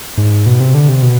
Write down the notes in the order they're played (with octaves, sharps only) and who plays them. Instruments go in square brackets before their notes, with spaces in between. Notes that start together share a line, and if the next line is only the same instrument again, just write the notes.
[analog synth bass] G#2
B2
C3
D3
C3
B2